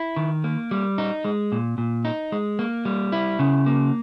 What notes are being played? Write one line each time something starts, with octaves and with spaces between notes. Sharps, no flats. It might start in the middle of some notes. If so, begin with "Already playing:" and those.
Already playing: E4
D#3
A#3
G3
D#4
G#3
A#2
A#2
D#4
G#3
A#3
G3
E4
C#3
A#3